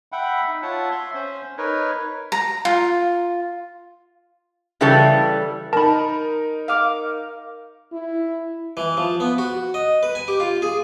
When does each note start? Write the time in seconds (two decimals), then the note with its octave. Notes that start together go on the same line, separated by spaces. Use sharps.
0.12 E5 F#5 G5 B5
0.48 D#4
0.62 F4 C#5 E5 F#5 A5
0.91 E5 C6
1.14 C#4 C5
1.57 D#4 A#4 B4 C#5
2.32 A#5
2.65 F4
4.81 C#3 E3 G3 A4
5.73 D#4 A#4 A5 B5
6.68 F5 D6
7.93 E4
8.77 E3
8.97 F3
9.20 B3
9.38 F#4
9.74 D#5
10.03 B4
10.15 G#5
10.28 G4
10.40 F4
10.62 G#4